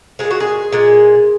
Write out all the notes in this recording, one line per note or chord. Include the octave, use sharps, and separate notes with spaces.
A#2 G#3 G#4
F#4
G#4
A#2 G#3